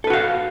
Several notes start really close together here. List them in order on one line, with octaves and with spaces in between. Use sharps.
A4 B4 F#4 F5